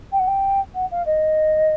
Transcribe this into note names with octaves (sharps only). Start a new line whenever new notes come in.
G5
F#5
G5
F#5
F5
D#5